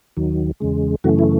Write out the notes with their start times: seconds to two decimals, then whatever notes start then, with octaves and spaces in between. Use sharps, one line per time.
0.17 D#2 D#3 F#3
0.60 E2 C#3 G#3
1.04 F#2 C#3 E3 A3 F#4
1.19 E4